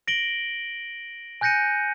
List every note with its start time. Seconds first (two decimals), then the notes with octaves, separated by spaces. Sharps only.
0.08 A#6 D7 F#7 G7
1.41 G#5 F#6 G6 A#6 C#7 D#7